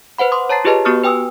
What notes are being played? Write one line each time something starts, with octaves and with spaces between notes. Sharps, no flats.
B4 C5 F#5 B5
C6 D6 D#6
C#5 A5 A#5 A6 C7
F4 G4 G#4 B4 D#5 A5
B3 F#4 G4 C#6 D#6 F6
B4 G5 G#5 D#6 E6